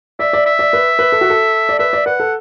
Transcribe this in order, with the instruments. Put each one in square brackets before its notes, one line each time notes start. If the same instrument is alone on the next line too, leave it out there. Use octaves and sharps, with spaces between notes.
[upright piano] D5 [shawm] E5
[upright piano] D5
[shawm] E5
[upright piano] D5
B4
B4
A4
F#4
A4
D5
[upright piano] B4 [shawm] E5
[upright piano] D5
[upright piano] B4 [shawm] F#5
[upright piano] A4